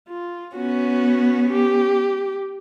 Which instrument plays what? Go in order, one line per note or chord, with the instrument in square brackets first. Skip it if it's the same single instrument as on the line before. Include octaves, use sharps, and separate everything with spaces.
[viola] F4
[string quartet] B3 C#4 [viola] F#4
[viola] G4